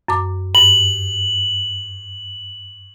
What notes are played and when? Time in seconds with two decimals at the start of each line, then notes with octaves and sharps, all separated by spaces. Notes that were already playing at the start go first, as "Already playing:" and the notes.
0.08 F#2 A5 D6
0.55 G2 F#7